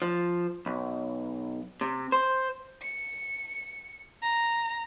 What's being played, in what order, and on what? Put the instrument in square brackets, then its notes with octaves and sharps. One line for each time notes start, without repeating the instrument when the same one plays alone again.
[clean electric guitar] F3
B1
C3
C5
[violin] C#7
A#5